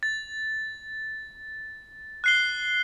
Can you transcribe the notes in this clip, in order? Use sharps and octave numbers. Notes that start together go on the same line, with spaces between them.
A6
F#6 C7 G7